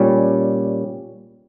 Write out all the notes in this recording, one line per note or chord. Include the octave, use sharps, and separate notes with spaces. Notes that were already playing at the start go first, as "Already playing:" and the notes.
Already playing: A#2 G3 C#4